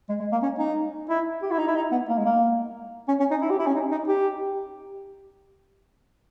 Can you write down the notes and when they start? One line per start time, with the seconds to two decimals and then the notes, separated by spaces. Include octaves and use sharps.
0.09 G#3
0.20 G#3
0.32 A#3
0.43 C#4
0.58 D#4
1.09 E4
1.42 G4
1.51 E4
1.58 D#4
1.67 E4
1.76 D#4
1.92 B3
2.09 A#3
2.18 G#3
2.26 A#3
3.08 C#4
3.20 C#4
3.31 D#4
3.42 E4
3.50 G4
3.59 E4
3.67 C#4
3.75 D#4
3.91 D#4
4.08 G4